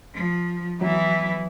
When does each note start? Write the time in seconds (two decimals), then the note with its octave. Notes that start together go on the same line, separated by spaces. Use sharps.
0.14 F3
0.81 E3 F#3 B3 E4